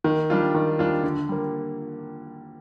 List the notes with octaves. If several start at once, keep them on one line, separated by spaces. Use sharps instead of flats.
D#3
G3 D4 F4
D#3
G3 D4 F4
D3
G3 A#3